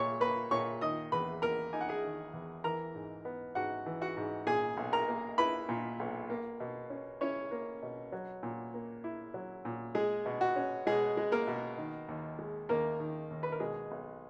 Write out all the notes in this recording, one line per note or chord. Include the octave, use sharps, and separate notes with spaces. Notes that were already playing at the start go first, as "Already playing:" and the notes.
Already playing: A#2 C#5 C#6
A#3 B4 B5
A#2 C#5 C#6
D#3 D#5 D#6
E2 B4 B5
A#3 A#4 A#5
D#4 G#5
F#5
G#4 G#5
D#3
E2
E3 A#4 A#5
G#2
B3
G#2 F#4 F#5
E3
F#4 F#5
G#2
A#2 G#4 G#5
B1
A#4 A#5
A#3
E4 B4 B5
A#2
B1
A#3
B2
C#4
C#4 E4 C#5
A#3
B2
F#3
A#2
A#3
E4
F#3
A#2
G#3 G#4
B2
F#4
C#4
B2 G#3 G#4
G#3
A#3 A#4
B2
D#3
D#2
G#3
D#2 A#3 A#4
D#3
D#2
B4
A#4
B2 G#3 G#4
B1